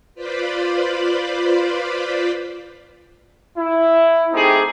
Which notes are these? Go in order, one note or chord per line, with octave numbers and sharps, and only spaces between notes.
F4 B4 C5 D5 B5
E4
A3 C4 D#4 G4 G#4